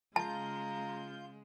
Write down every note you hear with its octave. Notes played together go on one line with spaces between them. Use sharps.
C#3 G#3 F4 A5 A#5 G6